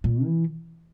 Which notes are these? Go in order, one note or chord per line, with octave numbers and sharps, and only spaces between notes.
A#2
E3